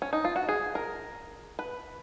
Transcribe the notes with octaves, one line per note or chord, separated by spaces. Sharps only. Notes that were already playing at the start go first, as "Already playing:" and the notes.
C#4
D#4
F4
F#4
G#4
A#4
B4